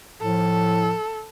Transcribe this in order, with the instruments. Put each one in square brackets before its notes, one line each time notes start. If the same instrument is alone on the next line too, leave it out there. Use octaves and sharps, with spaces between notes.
[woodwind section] A2 F3 [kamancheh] A4